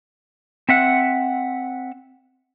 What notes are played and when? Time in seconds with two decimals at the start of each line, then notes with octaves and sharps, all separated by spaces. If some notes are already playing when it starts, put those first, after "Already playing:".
0.69 C4 E5 F#5